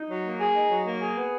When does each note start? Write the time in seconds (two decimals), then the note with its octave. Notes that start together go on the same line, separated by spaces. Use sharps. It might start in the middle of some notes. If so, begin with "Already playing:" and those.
Already playing: D#4
0.08 F#3
0.24 A#3
0.39 G#4
0.55 D#4
0.70 F#3
0.86 A#3
1.01 G#4
1.16 B3